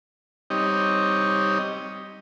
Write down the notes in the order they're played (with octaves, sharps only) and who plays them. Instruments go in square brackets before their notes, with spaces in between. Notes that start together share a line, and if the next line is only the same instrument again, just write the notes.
[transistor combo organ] G3 C4 D#4 G4 C#5 D#5